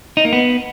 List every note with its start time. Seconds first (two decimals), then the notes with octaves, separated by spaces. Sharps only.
0.17 D#4
0.25 A#3
0.33 B3